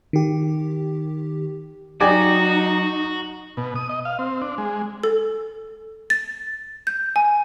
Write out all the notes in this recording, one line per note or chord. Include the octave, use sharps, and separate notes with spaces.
D#3 G4
F#3 D#4 F#4 G4 D5 G#5
B2
D#6
D#5
F5
C4
D4
G#3
A4
A6
G6
G#5